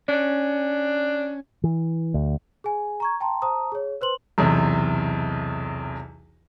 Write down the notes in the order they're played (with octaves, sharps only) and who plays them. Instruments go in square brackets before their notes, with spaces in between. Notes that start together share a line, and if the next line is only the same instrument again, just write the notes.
[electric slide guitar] C#4 [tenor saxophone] D4
[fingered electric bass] E3
D2
[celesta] G#4 G#5
A#5 C#6 G#6
G5 A5 A#5 C6
C5 A5 A#5 D#6
G#4 C#5
B4 C5 C6 F#7
[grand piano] B1 E2 C3